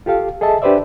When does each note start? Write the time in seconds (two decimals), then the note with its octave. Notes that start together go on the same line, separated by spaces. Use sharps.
0.06 F4 G4 A4 F5
0.41 G#4 A4 D#5 E5 A5
0.62 D4 G4 B4 C5 D5 E5